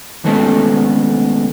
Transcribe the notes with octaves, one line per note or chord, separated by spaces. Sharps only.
D#3 G#3 A3 B3 C#4 A4